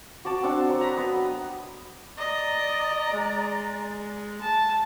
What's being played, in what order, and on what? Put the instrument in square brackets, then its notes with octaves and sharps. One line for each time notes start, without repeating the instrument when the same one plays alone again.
[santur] F#4 D5 A5
C4 D4 F#5
F#3 C5
A#5 B5
B3 D#5
[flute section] D5 A#5 [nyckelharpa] D#5
[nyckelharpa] G#3
A5